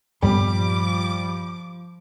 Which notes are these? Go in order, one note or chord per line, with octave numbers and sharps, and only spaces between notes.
G2 A#2 F3 G3 B3 D6